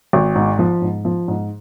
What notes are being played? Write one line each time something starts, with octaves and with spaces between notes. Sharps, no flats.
G#1
G#2
F3
G#2
F3
G#2